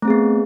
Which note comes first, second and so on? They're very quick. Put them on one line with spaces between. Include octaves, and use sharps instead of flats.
A3 C4 G#4 B3